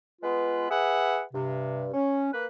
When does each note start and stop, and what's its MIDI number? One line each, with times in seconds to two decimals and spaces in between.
0.22 0.67 56
0.22 0.67 59
0.22 0.67 65
0.22 0.67 71
0.69 1.22 68
0.69 1.22 71
0.69 1.22 76
0.69 1.22 78
1.33 1.87 43
1.33 1.87 48
1.93 2.31 61
2.33 2.46 58
2.33 2.46 71